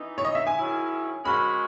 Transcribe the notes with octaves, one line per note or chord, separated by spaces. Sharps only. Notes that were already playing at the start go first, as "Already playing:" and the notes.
Already playing: E3 B3 D#4
C#5
D#5
E5
G#5
G#2 D#3 F#3 C#4 E4
G#2 D#3 G#3 C#4 F#4 B5